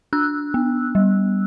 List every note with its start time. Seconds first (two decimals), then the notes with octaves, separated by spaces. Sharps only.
0.13 D4 E6 F#6
0.54 B3
0.95 G3